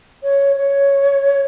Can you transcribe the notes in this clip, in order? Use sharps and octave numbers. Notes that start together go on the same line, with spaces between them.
C#5
C#5